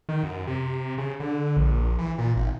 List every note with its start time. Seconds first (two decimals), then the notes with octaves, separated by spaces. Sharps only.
0.09 D#3
0.23 F#2
0.47 C3
0.98 C#3
1.20 D3
1.57 A#1
1.99 E3
2.18 A#2
2.36 G#1